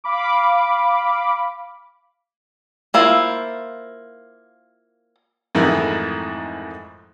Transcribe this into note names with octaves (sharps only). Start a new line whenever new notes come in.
F5 B5 D6
A#3 E4 F4 C5
F2 G#2 D#3 E3 A3 E4